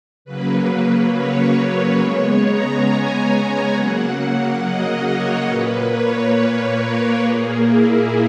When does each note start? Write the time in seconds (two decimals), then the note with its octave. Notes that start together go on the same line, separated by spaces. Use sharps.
0.25 C#3 F#3 A#3 B4
0.69 B4
1.13 C#5
1.98 C#3 G#3 B3
2.43 A#5
2.85 G#5
3.29 G#5
3.73 C#3 F#3 A#3 F#5
4.16 F#5
4.60 D#5
5.03 C#5
5.47 A#2 A#3 B4
5.90 C#5
6.34 B4
6.78 A#4
7.20 A#2 A#3 G#4
7.64 E4